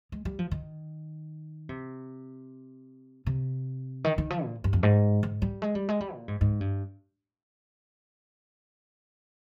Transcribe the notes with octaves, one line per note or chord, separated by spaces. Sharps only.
G#3
G3
F3
D#3
C3
C3
D#3
D#3
F3
A#2
G2
F2
G#2
G#2
G3
G#3
G3
G#3
G3
A#2
G#2
G#2
G2